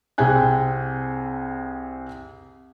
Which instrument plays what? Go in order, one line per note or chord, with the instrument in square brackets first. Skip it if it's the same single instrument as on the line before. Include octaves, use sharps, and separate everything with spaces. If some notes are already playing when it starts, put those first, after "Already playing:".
[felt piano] C2 C4 G#4 G5 G#5 F#6